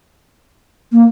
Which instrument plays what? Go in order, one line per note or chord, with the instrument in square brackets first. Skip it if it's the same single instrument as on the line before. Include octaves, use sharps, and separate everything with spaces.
[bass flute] A#3